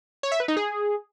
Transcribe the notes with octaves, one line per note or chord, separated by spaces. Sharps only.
C#5
E5
B4
D#4
G#4